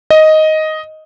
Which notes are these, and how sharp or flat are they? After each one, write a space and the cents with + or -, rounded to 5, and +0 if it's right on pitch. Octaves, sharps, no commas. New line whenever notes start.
D#5 +5